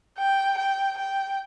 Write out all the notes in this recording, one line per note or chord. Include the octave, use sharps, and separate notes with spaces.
G5
G5
G5